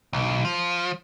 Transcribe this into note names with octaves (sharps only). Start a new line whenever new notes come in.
B1
F3